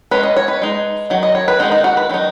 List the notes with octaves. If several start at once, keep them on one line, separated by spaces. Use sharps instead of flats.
G#3 C#4 B4
D#5
C#5
B4
G#3 D#4
D#3 F#3
D#5
C#5
B4
D#3 G#3 D#4 F#4
D#4
F#4
B4
D#3 F#3 D#4